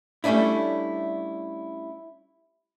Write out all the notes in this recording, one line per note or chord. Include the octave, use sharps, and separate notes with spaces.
G3 A3 C#4 D4 E4